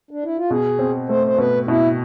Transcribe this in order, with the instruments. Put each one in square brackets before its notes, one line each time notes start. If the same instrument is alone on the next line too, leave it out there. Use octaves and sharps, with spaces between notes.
[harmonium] D4
E4
F4
[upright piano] B2 [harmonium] G#4
[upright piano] C4
[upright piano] A3 [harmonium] C5
[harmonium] C5
[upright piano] B2 [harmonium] B4
[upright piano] B2 [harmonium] E4